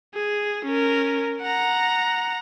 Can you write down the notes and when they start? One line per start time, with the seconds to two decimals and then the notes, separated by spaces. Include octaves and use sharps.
0.14 G#4
0.65 C#4 A#4
1.42 F#5 A#5